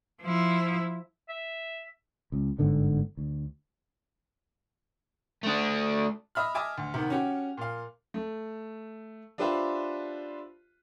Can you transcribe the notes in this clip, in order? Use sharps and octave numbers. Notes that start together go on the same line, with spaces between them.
F3 E4
E5
C#2
G1 G#2 D3 B3
D2
A3 D4
D#5 E5 B5 F6
D#5 E5 G#5 A5 D6
D2
C3 D#3 B3
C#4 F#4 G4
A#2 F5
A3
D4 F4 G4 B4 C5 E5